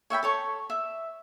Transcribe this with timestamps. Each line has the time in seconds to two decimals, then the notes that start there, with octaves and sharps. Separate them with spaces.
0.10 C#5 E5 G5 B5
0.23 A4 C#5 C#6
0.70 E5